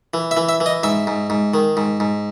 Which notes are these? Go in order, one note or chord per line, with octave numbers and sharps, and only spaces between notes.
E3
E5
E3
E5
E3
D#5
G#2 E5
G#2
G#2
D#3
G#2
G#2